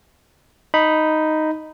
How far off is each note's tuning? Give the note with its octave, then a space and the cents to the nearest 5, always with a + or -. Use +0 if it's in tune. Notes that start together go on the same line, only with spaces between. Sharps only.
D#4 +0 B5 +0